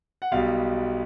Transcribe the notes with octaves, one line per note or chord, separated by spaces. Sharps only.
F#5
B1 B2 G3 F5